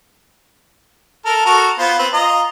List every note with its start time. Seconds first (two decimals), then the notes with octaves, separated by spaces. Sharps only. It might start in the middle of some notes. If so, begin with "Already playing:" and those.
1.25 A4 A#4
1.46 F#4 A4 A#4
1.79 B3 F4 C5
1.99 C4 B4
2.13 F4 D#5 A#5